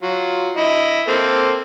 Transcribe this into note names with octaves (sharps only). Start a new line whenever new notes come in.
F#3 F4
E4 D#5
A#3 C4 A4